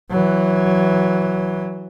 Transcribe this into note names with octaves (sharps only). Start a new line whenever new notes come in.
E3 F#3